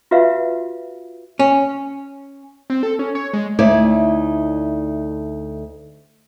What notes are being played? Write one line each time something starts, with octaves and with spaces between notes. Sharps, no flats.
F4 F#4 B4 E5 F5
C#4
C4
A4
C#4
C#5
G#3
D2 A3 D#4 E4 C#5 D5